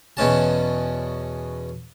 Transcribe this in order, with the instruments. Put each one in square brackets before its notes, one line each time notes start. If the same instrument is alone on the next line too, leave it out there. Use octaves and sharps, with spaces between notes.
[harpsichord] E2 B2 C#4 A5